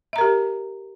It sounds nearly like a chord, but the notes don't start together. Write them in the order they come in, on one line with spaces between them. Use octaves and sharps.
E5 A#5 A#4 G4